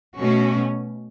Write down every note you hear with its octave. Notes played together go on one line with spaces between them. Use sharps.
B2 A3 C#4 F#4